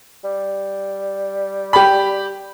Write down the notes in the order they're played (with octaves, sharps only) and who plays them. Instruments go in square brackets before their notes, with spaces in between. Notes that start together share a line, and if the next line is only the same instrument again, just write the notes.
[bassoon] G3
[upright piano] G4 B5